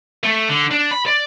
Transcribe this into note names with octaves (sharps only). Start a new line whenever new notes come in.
A3
D3
D4
B5
D5